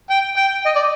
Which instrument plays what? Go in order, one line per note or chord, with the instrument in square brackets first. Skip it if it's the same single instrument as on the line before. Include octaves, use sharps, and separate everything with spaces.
[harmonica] G5
G5
D#5
D5